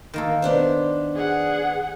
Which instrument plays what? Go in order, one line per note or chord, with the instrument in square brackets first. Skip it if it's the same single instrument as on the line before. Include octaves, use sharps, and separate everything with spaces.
[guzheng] D#3 A#3 A4
[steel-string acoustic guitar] B3 D4 C5
[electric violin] G#4 F#5